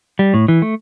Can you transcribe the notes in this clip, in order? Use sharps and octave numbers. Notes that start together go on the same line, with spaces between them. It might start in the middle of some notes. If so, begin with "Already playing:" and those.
G3
A2
E3
A3